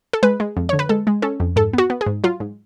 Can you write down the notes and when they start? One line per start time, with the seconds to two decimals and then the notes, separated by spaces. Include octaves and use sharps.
0.13 A4
0.23 G#3 B4
0.40 G#3
0.57 F2
0.69 D3 C#5
0.79 B4
0.89 G#3 A4
1.07 G#3
1.22 C#4 A4
1.40 F2
1.56 G#2 A4
1.73 B3 F#4
1.90 B3
2.01 G#4
2.06 G#2
2.24 F#3 F4
2.40 G#2